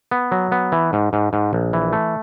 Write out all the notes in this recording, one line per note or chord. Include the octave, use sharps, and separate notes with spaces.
B3
F#3
B3
E3
G#2
G#2
G#2
A#1
E3
A3